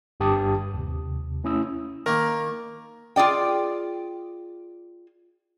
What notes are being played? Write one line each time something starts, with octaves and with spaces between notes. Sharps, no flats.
G1 G2 G4 A5 D#6
D#2 C3
A3 C#4 E4 D#6 E6
D#3 A#3 A#4
F4 G#4 D5 G5